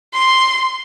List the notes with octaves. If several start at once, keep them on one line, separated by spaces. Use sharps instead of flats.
C6